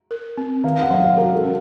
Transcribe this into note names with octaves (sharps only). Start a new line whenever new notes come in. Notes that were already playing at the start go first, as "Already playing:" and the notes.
A#4
C4
D#3 F5
F#5
F#3 F5
F#5
F#4 A#4
A4
C#4